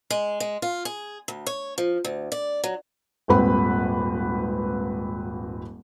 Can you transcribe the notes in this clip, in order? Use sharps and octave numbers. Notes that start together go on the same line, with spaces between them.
G#3
G#3
F4
G#4
D2
C#5
F3
D2
D5
F#3
D#1 G#1 C4 B4 B5